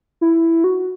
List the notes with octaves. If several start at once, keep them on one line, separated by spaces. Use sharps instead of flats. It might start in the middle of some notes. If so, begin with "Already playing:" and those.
E4
F#4